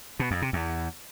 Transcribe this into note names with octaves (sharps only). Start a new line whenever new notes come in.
B2
F2
C3
E2